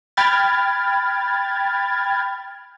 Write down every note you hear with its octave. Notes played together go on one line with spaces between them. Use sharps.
G5 B5 F6 G#6 A6